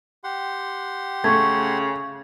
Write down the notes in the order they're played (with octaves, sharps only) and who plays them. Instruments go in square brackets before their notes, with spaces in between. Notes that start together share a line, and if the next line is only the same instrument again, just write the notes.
[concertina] G4 F#5 C6
[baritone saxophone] C#3 [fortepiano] A3 [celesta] C#6 G#6